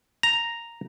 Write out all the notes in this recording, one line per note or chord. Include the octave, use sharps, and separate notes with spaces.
A#5